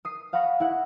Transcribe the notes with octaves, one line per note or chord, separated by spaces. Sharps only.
D#6 C7
F5 F#5 B5 C#6 A#6 C#7
E4 F#5